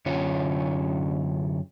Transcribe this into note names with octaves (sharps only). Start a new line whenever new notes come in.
F#2 D3 C#4 F4 C#5